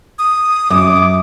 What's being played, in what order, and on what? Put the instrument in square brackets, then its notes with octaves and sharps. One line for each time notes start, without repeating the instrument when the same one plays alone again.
[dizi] D#6
[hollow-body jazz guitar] F#2 [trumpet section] D6